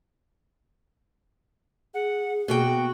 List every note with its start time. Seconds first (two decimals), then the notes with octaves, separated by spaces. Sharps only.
1.94 G#4 F#5
2.48 B2 A#3 F#4 G5